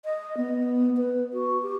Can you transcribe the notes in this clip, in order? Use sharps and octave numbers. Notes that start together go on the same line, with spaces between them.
D#5
B3
B4
F#4
G4